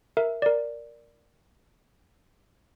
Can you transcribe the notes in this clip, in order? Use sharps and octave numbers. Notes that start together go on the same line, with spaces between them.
A#4 E5
A#4 D5